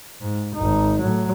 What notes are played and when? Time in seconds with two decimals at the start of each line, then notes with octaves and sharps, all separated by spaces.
0.21 G#2
0.54 G#1 D#4
0.99 A2 F#3